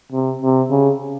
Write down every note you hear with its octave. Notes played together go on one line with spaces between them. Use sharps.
C3
C3
C#3